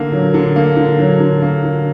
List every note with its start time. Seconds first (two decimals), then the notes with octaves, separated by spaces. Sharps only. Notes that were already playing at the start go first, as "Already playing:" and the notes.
Already playing: D3 A#3
0.12 F#3
0.34 D3
0.56 A#3
0.77 D3
0.99 F#3
1.20 D3
1.42 A#3
1.63 D3